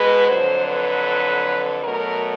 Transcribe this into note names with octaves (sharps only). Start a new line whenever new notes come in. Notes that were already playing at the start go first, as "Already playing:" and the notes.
Already playing: B2 G#3 B4
F2 D3 F#3 C5
B4
B2 F#3 A3 A#4